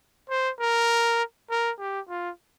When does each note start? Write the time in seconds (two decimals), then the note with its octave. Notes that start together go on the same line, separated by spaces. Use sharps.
0.30 C5
0.60 A#4
1.50 A#4
1.79 G4
2.09 F4